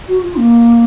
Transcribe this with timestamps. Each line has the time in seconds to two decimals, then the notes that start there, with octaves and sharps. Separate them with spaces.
0.08 F#4
0.23 F4
0.37 A#3